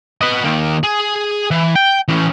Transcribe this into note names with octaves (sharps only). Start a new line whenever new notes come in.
B4 D#5
D#3 A#3
G#4
E3
G5
E3 C#4